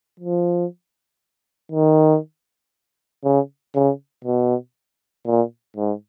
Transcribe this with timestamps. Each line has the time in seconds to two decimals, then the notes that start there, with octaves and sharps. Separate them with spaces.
0.20 F3
1.72 D#3
3.24 C#3
3.75 C#3
4.25 B2
5.26 A#2
5.76 G#2